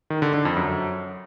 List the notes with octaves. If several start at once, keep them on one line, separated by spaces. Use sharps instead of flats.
D#3
D3
D3
F2
F#2